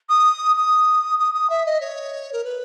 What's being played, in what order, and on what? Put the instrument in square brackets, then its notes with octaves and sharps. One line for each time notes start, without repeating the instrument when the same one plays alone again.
[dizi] D#6
D#6
D#6
D#6
E5
D#5
C#5
A#4
B4